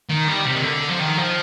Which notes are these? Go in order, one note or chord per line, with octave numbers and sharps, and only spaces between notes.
D#3
G3
C3
D#3
D3
F3
D#3
F3